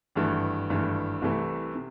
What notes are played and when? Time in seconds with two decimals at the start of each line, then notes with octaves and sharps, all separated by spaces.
0.15 G#1 G2 E3 A3
0.70 G#1 G2 E3 A3
1.22 C2 C3 E3 A3
1.75 C3